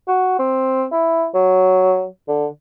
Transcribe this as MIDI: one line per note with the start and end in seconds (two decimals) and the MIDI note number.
0.08 0.38 66
0.39 0.85 60
0.92 1.26 64
1.34 2.06 54
2.28 2.46 50